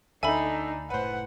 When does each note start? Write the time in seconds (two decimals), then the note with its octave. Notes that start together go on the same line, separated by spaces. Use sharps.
0.23 D2 D4 D#4 A4 E5 G#5 B5
0.90 F#1 A2 B4 C5 F#5